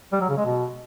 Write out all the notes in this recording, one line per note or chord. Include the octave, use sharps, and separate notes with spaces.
G3
F#3
C#3
G#3
B2